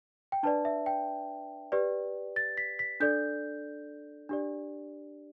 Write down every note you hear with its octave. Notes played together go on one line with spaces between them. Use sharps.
G5
D4 B4 D5 A5
E5
G5
G4 B4 D5
A6
B6
B6
D4 A4 D5 G6
D4 G4 D5